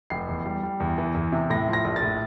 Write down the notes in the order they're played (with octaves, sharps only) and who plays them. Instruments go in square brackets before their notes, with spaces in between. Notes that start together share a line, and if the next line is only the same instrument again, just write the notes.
[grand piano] F1 C7
E2
G3
G3
E2
E3
E2
C3
A2 A#6
F3
A#6
A#1
A6
A2